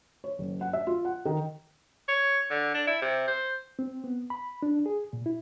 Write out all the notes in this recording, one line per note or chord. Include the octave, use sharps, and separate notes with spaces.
C#5
F#1
F#5
E5
F4
F#5
D#3
C#5
D3
D4
E4
C3
C5
C4
B3
B5
D4
G#4
A#2
E4